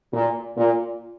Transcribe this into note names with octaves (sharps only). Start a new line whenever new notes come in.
A#2
A#2